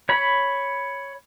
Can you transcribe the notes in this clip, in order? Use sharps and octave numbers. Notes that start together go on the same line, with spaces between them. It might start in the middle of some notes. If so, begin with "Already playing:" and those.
C#5 B5